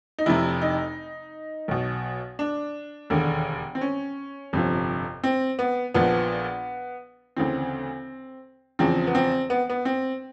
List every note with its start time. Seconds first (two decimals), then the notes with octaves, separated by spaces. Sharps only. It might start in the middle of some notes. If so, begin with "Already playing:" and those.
0.18 D#4
0.26 F1 F2 C3 E4
0.62 D#4
1.68 B1 B2
2.39 D4
3.10 E1 D#2 D3
3.75 C4
3.81 C#4
4.53 G1 F2 C3 F3
5.24 C4
5.59 B3
5.94 A#1 A#2 F3 B3
7.36 D2 C#3 E3 C4
8.79 E2 C#3 F3 C4
9.07 B3
9.15 C4
9.50 B3
9.69 B3
9.85 C4